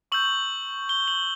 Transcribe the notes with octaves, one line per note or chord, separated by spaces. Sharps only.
C#6 E6 G6 F#7
G7
F#7